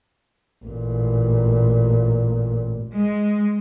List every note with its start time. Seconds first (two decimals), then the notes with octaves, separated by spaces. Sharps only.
0.64 A1 A#2
2.93 G#3